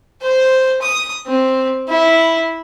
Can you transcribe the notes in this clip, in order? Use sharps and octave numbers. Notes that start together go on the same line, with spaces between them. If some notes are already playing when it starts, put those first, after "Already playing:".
C5
D#6
C4
E4